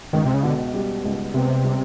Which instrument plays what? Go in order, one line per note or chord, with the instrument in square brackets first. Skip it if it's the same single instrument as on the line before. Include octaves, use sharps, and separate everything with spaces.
[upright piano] C#2 [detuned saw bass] D#3
[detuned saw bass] C3
C#3
[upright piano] B2 [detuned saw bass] D3
[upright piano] G3
C#2
[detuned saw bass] C3 [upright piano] B3
[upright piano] G3